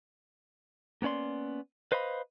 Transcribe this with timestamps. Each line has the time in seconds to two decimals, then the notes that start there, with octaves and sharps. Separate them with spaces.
1.02 A#3 B3 C#4 D5 C6
1.92 B4 C5 D#5 F5 B5